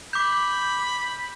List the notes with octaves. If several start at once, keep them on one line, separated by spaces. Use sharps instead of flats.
B5 D6 G6